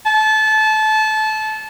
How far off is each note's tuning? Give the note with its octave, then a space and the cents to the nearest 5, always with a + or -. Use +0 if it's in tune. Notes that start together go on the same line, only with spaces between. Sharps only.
A5 -25